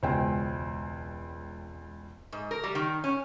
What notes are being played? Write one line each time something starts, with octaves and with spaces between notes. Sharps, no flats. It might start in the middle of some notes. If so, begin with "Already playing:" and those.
E1 C#2 C5 G5 G#5
G#2
A#4
G3
D#3
C#4